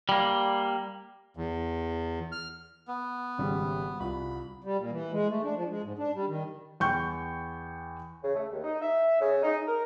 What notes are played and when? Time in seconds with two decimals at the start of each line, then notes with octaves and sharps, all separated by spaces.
0.09 G3 A#3
1.37 E2
2.32 F6
2.88 B3
3.38 G#1 C#3 G3
4.00 C2 F4 F#4 B5
4.64 G3
4.78 A#2
4.91 E3
5.12 G#3
5.29 A3
5.44 D4
5.56 F3
5.69 G#3
5.83 G#2
5.99 D4
6.15 G3
6.28 D#3
6.80 E2 G5 C#6 G6
8.23 C#3
8.36 A3
8.52 D#2
8.64 D#4
8.81 E5
9.21 C#3
9.43 D#4
9.67 A#4